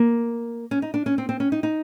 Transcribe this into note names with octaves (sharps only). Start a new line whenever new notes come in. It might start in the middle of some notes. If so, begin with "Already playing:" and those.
Already playing: A#3
C#4
D#4
D4
C#4
C4
C4
C#4
D#4
D#4